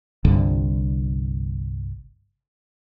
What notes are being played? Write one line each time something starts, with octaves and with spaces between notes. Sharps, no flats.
G1 C2 G2 D3